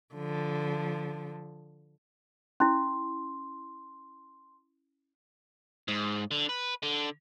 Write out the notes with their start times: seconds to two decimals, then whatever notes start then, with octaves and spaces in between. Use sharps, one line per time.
0.14 D3 F3
2.60 C#4 E4 C6
5.88 G#2
6.31 D3
6.49 B4
6.83 D3